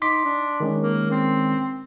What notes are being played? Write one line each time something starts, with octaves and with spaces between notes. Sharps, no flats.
D#4 C6 D6 B6
D4
D#3 G#3 C#4
A#3
C4